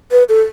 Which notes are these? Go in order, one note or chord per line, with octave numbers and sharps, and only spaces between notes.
B4
A4